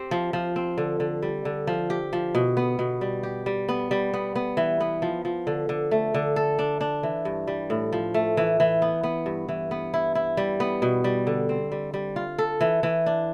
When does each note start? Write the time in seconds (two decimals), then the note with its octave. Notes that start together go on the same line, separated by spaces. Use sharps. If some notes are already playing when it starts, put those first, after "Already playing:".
Already playing: C4 G4
0.11 F3
0.33 F3
0.56 C4
0.78 D3
1.00 D3
1.22 G3
1.45 D3
1.67 F3
1.90 G4
2.13 F3
2.35 B2
2.57 B3
2.79 B2
3.01 G3
3.23 G4
3.46 G3
3.69 B3
3.91 G3
4.14 B3
4.36 B3
4.57 E3
4.81 B3
5.02 F3
5.25 F3
5.47 D3
5.69 D3
5.91 A3
6.14 D3
6.36 A4
6.59 D4
6.81 D4
7.03 E3
7.25 G2
7.47 G3
7.70 A2
7.92 F3
8.14 A3
8.37 E3
8.60 E3
8.82 B3
9.03 B3
9.26 G2
9.49 E3
9.71 B3
9.94 E4
10.15 E4
10.37 G3
10.60 B3
10.82 B2
11.04 G3
11.27 D3
11.49 C4
11.72 G3
11.94 G3
12.16 F4
12.38 A4
12.61 E3
12.83 E3
13.06 D4